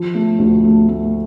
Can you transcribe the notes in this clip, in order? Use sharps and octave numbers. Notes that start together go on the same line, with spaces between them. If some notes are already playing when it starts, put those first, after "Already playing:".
Already playing: F3
A3
D2
A3
A3